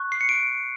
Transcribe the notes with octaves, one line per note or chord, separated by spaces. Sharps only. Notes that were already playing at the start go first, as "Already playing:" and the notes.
Already playing: C#6 F#6
C7
C#7
D7